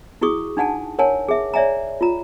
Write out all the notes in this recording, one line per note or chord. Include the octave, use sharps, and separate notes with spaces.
E4 F#4 G#4 C#6 D#6
D4 D#4 F#5 G#5 A5
A#4 C#5 F#5 G#5 A5
G#4 E5
C#5 D5 E5 G#5 A#5
F4 A#5